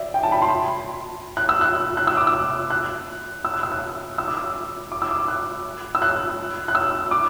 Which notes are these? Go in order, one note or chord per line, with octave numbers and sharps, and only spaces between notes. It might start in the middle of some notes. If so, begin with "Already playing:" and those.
Already playing: D5 E5
G5
A5
B5
C6
F#6
E6
F#6
F#6
E6
D6
E6
F#6
E6
F#6
E6
F#6
E6
D6
E6
D6
E6
D6
F#6
E6
F#6
F#6
E6
D6